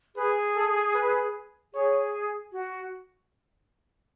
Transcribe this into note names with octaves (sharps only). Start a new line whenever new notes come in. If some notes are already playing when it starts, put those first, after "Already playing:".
G#4 B4
A4
B4
G#4 C#5
F#4